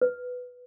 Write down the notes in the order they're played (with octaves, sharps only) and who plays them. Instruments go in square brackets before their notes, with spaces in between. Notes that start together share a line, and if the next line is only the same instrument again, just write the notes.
[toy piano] B4